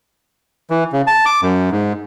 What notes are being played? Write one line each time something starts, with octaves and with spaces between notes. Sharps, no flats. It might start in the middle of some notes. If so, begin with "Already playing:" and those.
E3
C#3
A5
D6
F#2
G#2